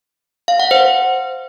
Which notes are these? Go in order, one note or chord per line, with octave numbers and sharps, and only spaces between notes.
F5
F#5
C5